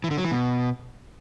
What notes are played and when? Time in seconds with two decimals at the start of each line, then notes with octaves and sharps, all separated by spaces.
0.04 E3
0.11 D3
0.18 F#3
0.25 E3
0.31 B2